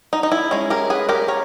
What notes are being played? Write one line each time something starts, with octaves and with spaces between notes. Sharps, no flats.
D#4
D#4
E4
G#3 C#4
G4 A#4
G#4 B4
G4 A#4
A#4 C#5